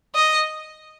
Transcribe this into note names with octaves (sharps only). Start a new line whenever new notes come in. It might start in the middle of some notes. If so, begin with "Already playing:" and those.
D#5